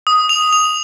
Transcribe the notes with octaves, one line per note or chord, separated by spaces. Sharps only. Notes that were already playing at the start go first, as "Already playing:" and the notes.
D#6
F7
F7